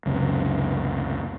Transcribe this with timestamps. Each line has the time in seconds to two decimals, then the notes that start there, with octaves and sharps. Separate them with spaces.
0.06 C#2 F#2 C3